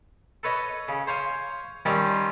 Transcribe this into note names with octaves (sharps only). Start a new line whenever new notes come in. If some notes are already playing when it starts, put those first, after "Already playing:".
A4 B4 C#5 D#5
C#3
C5 C#5 F5 G#5
D#3 F3 G3 C4 C#4 F4